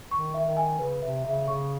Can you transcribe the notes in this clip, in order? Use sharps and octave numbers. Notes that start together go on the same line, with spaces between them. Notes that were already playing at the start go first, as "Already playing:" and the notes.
D#3 C#6
E5
D#3
G#5
C#3 B4
C3 E5
C#3 E5
C#3 C#6